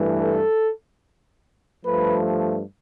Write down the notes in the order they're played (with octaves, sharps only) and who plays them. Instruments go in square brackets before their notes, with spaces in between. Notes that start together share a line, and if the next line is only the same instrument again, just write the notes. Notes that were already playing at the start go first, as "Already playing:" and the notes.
Already playing: [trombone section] G2 E3 A3
A4
G2 F3 A3 B4